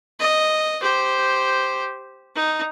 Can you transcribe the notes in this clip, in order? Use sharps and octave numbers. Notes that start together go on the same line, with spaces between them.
D#5
G4 C5
D#4